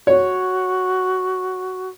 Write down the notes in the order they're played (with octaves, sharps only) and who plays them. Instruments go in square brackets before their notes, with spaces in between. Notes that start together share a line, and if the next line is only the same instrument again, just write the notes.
[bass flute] F#4 [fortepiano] C#5